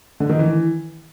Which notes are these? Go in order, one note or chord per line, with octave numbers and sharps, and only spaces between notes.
D3
D#3
E3